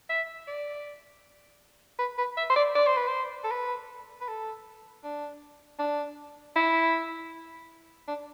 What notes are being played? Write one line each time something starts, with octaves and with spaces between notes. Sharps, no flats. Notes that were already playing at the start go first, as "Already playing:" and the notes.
E5
D5
B4
B4
E5
C5
D5
D5
C5
B4
C5
A4
B4
B4
A4
D4
D4
E4
D4